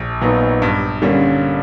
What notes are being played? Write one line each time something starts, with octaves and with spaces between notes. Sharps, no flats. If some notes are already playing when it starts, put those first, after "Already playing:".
Already playing: A#1
A#2 F#3 B3 D#4
G2
D3 G3 A#3 C#4